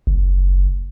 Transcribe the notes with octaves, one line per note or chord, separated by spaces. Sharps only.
F#1